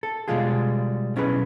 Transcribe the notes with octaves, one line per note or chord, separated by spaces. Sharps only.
A4
B2 D3 G3 G#3 F4 G#4
B1 C#4 E4 G#4 B4